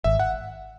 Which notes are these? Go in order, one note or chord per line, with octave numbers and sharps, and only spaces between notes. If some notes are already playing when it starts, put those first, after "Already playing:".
G#1 E5
F#5